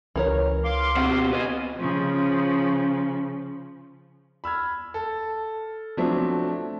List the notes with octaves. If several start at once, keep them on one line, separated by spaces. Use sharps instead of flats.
C#2 E3 A#4 C#5
F5 C6 D6
B2 C4 F#4 F#5
D2 B3 B4 D#5 G#5
C#3 F3
B5 E6 F6 G#6
A4
F3 F#3 A3 C4 D4